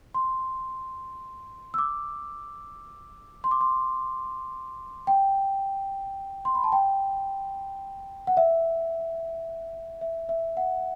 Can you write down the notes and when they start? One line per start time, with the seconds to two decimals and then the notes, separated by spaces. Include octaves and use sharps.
0.14 C6
1.74 E6
1.78 D6
3.44 C6
3.51 D6
3.61 C6
5.07 G5
6.45 C6
6.55 B5
6.64 A5
6.72 G5
8.27 F#5
8.37 E5
10.01 E5
10.29 E5
10.57 F#5